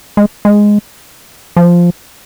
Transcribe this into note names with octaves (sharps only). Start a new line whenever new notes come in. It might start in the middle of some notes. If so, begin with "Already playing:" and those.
G#3
G#3
F3